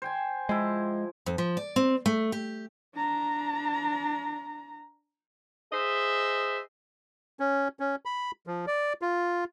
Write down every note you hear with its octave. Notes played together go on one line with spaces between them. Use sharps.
C5 G5 G#5
F3 G#3 E4
F2
F3
D5
C4
A3
G4
D4 A#5
G#4 C5 D#5 E5
C#4
C#4
B5
F3
D5
F4